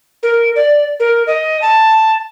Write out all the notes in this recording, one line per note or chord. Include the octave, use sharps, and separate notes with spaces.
A#4
D5
A#4
D#5
A5